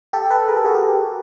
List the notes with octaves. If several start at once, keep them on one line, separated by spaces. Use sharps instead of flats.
G4 A4
A4 B4
G#4 A#4
G4 A4
F#4 G#4
G4 A4